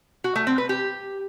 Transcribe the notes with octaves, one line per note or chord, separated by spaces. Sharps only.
F#4
A3
C4
B4
G4